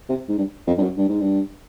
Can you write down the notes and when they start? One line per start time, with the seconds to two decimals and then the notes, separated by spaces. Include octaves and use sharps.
0.09 C3
0.29 G#2
0.38 G2
0.67 F2
0.78 G2
0.83 F#2
0.97 G2
1.09 G#2
1.21 G2